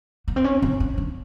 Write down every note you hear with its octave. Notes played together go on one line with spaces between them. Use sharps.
B3
C4
C#4
C4
C#4
D4